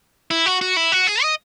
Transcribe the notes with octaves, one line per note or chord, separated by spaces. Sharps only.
E4
F#4
F#4
E4
F#4
G#4
D#5